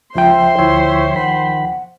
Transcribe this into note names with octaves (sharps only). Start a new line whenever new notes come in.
C#2 F3 C5 E5 G5 C6
D2 E4 C#5 E5
D#3 F#5 B5